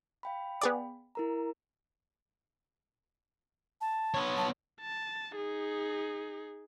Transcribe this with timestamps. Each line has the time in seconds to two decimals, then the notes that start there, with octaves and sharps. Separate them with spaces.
0.23 F5 G5 B5
0.61 B3 G#4 D5
1.15 E4 A#4 A#5
3.81 A5
4.14 B3 C#5
4.37 A5
4.81 A5
5.36 D#4 G#4